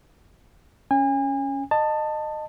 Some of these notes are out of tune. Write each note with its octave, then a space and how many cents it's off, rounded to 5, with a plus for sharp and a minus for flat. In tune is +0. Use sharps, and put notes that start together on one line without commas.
C#4 +0 G#5 -35
D#5 -20 A5 +15